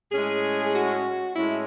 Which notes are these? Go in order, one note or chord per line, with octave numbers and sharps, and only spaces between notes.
A2 G#3 C#4 G#4
F#4
A2 G#3 C#4 E4